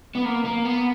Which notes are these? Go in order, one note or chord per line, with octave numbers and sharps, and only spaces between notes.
B3
A#3
A#3
B3